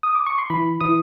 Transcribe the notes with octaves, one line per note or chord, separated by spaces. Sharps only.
D#6
D6
C#6
C6
E3 B5
E3 D#6